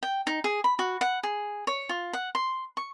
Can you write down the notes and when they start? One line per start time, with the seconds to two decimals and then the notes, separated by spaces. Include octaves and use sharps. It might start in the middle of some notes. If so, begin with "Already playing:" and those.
0.03 G5
0.27 D#4
0.44 G#4
0.64 B5
0.79 F#4
1.01 F#5
1.23 G#4
1.67 C#5
1.89 F4
2.13 F#5
2.35 C6
2.77 C#6